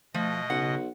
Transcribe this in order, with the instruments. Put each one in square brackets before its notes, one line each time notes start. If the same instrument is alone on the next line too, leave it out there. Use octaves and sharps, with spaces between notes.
[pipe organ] B2 D#5 D#6 [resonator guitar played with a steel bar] F3 [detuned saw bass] A3
[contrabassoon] B1 [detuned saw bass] C#3 [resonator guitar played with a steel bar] F#5